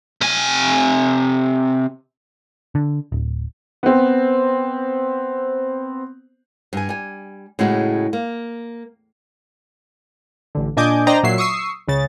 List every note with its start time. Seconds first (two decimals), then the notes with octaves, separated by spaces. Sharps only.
0.21 C3 G#5
2.75 D3
3.12 D1
3.83 B3 C4
6.73 G2 G#5
6.89 G3 G#5
7.59 A2 C#3 G#3 D#4 E4 F#4
8.13 A#3
10.55 A1 D3
10.77 A#2 D4 D#5 G#5 D6 G6
11.07 D4 C5 D5 D#5 G5 A#5
11.23 A#2 F#3 E5 C7
11.38 C#6 D#6 E6 C7
11.88 C#2 C#3 A6